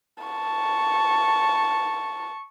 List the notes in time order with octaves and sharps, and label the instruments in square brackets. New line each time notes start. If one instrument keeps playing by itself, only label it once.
[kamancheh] A5 C#6